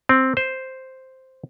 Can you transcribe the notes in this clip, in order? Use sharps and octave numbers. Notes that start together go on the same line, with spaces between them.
C4
C5